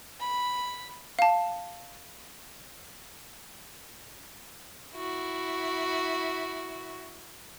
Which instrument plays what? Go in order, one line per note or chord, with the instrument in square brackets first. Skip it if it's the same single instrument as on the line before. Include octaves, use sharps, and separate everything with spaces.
[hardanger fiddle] B5
[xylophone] F5 A5
[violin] E4 F#4